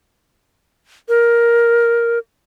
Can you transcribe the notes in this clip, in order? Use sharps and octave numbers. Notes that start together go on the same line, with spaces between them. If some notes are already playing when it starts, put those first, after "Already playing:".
A#4